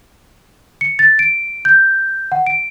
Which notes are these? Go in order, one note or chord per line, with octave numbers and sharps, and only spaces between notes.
C#7
A6
D7
G6
F#5
D7